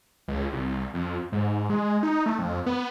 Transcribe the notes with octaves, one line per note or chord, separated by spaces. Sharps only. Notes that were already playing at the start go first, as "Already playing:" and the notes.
C#2
C2
F2
G#2
G#3
D#4
A3
F2
B3